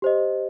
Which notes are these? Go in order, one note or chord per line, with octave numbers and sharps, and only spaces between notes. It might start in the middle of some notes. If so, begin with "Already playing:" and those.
G4 C5 D#5